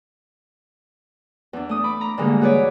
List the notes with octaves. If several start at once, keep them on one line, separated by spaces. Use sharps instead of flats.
E2 D4
A3 D#6
B5 D6
A#5
G#2 D3 E3 G3 G#3 A#3
F#4 G#4 B4 C#5 D5